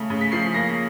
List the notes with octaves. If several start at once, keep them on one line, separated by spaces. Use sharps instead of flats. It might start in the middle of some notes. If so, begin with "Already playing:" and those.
Already playing: C#3 A3
C#3
B6
F3 C7
A#3 A#6